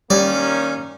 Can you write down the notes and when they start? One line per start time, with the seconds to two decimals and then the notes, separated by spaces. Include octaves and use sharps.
0.10 D#3 G3 A#3 C#4 D5